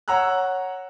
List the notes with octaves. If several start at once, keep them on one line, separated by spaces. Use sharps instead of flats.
C#5 F#5 A#5 E6 F#6